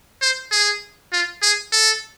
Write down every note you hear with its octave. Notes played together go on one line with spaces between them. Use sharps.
C5
G#4
F4
G#4
A4